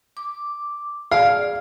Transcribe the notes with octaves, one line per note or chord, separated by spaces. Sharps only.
D6
G#4 D5 F5